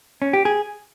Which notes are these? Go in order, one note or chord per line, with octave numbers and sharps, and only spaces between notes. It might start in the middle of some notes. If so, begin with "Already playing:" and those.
C#4
G4
G#4